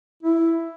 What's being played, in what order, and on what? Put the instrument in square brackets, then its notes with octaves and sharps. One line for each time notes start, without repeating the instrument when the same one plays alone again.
[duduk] E4